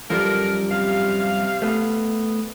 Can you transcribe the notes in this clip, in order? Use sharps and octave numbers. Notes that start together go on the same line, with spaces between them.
F#2 F3 G3 A4 A#4
C3 F5
A3 B3